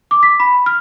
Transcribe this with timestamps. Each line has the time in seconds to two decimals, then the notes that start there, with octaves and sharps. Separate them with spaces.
0.11 D6
0.23 B6
0.40 B5
0.66 F6